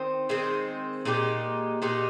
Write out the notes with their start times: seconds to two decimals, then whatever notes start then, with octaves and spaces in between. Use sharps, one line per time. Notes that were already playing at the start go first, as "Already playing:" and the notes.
Already playing: D#3 C4
0.29 D#3 G#3 C4
1.05 A#2 G#3 D#4 G4
1.82 A#2 G#3 D#4 G4